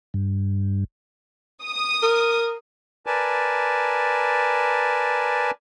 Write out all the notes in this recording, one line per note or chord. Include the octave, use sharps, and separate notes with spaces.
G2
D#6
A#4
A#4 B4 D5 G#5 A5